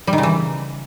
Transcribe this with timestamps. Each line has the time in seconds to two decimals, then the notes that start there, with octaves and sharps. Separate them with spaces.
0.07 G3
0.13 D#3
0.18 C#3
0.23 E3